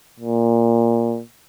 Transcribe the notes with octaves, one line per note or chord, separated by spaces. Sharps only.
A#2